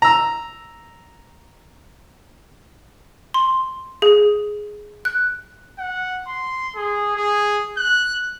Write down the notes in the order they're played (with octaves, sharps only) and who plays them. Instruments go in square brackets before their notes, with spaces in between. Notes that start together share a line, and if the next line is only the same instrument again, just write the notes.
[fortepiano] A#5 E6
[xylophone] C6
G#4
F#6
[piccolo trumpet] F#5
C6
G#4
G#4
F#6